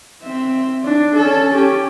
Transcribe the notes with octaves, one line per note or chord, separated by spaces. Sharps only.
C4 E5
D4
C#4 A4
C#4 G4